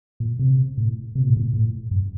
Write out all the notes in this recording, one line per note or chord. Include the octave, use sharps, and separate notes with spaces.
A#2
C3
A2
C3
A#2
A2
A#2
A2
F#2